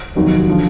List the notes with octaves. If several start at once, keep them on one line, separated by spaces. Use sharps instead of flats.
F1 D#2 D#3 F#3
D3 F3